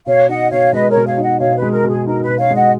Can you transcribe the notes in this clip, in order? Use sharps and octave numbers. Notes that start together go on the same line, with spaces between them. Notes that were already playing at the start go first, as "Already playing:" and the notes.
B2 C#5 F5
D#4 D#5 F#5
B2 C#5 F5
G#3 B4 D#5
A#4 C#5
B2
C#5 F5
D#4
D#5 F#5
B2 C#5 F5
B4
G#3
A#4
B2
G#4
D#4 A#4
B4
B2
C#5 F5
G#3
D#5 F#5